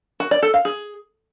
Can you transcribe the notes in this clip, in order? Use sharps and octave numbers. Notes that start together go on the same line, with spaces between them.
F#4
D5
A4
F5
G#4